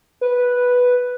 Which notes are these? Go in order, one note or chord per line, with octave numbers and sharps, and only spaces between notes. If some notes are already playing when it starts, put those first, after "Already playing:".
B4